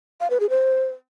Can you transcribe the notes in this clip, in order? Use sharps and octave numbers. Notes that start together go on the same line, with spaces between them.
F5
B4
G#4
C5